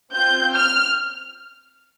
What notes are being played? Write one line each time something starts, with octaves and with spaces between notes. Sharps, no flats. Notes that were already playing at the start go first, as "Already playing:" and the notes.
C4 F4 G6
F6